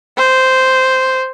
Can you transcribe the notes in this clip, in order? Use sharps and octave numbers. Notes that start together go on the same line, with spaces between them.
C5